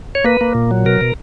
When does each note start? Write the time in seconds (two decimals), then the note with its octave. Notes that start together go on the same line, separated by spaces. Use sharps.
0.15 C#5
0.25 A#3 B4
0.41 A#3
0.55 A#2
0.71 F#3
0.85 B2 A#4
1.01 B2